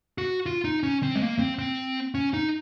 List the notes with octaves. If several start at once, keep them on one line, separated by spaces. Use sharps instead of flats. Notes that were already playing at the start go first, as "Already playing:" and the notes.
F#4
F4
D#4
C#4
C4
G#3
A#3
C4
C4
C#4
D#4